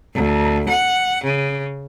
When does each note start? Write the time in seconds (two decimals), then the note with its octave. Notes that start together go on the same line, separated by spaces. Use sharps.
0.14 D2
0.69 F#5
1.24 C#3